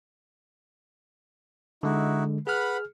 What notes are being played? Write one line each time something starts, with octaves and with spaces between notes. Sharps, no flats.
D3 G#3 D#4 E4 F#4
G#4 B4 F#5 B5 F6